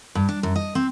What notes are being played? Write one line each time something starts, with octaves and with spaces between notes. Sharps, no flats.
G2
D4
F#2
D#5
C4